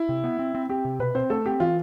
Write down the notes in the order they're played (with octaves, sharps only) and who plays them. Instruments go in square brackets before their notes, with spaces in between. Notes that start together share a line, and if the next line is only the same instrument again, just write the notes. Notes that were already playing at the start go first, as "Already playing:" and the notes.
Already playing: [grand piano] E4
[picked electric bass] C3
B3
C4
C4
[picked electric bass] C4 [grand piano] G4
[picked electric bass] C3
[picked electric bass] B2 [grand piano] B4
[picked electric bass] C4 [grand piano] C5
[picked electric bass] A3 [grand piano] A4
[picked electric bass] C4 [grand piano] G4
[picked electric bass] E3 [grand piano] F4